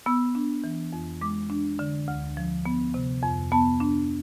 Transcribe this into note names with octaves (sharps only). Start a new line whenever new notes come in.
B3 E6
D4
E3
F2
G#3 D6
D4
D3
D2
F3
B3
C3
F2
B3 A5
D4